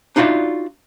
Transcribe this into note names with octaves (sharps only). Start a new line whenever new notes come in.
D4 D#4 F4 F#4 D5 E5